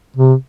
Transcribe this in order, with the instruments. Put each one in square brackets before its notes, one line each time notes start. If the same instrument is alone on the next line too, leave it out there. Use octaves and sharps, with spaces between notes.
[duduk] C3